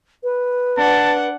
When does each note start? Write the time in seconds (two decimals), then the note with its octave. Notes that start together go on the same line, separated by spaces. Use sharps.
0.23 B4
0.78 D4 F#5 A5